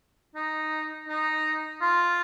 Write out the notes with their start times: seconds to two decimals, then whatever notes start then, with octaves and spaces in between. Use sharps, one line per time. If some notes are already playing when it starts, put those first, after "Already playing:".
0.35 D#4
1.08 D#4
1.81 F4